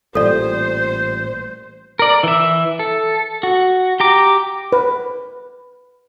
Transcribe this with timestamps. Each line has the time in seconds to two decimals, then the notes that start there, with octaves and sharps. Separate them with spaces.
0.15 A1 A#2 G3 A4 C5 D5
1.99 A#4 D5
2.23 E3 E5
2.79 A4
3.43 F#4
4.00 G4 A#5 D6
4.72 B4